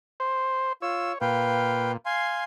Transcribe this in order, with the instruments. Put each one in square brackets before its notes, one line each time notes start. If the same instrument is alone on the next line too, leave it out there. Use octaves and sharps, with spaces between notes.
[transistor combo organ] C5
[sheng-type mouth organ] F4 E6 [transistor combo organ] C#5
[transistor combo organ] A#2 [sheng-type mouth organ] B4 F5 G5
[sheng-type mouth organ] F5 G#5 C6